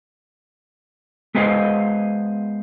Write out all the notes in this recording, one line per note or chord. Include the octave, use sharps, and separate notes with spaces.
G#3 B3 G#4 C5 D#5 F5